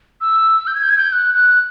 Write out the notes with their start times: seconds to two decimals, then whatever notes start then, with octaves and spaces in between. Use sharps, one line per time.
0.21 E6
0.67 G6
0.75 G#6
0.83 G6
0.90 G#6
0.98 G6
1.12 F#6
1.35 F#6